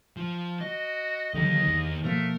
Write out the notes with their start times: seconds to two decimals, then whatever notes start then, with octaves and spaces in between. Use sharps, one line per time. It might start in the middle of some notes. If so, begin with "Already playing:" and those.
0.17 F3
0.61 F#4 D#5
1.34 D#2 D3 E3 F#3 G4 D#5
1.67 E2
2.04 B2 F3 A3 A#3 A#4